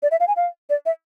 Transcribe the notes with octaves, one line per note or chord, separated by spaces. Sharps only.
D5
E5
F5
G#5
F5
D5
E5